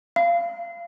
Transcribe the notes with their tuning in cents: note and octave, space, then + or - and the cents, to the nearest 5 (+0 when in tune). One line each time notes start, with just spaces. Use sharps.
F5 -25